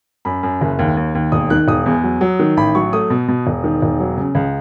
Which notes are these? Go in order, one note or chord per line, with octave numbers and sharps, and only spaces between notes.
F#2 B5
F#2
F#1
D#2
D#2
D#2
E1 D#6
D#3 F#6
E1 D#6
E2
F#3
F#3
D#3
A1 B5
F#3 C#6
A3 D#6
B2
B2
E1
D#3
E1
F#3
C#3
C#2